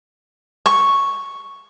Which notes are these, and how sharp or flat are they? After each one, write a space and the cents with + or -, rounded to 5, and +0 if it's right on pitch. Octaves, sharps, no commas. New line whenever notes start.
C#6 +0